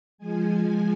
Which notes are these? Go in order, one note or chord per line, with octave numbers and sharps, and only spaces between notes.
F3 G#3 G#5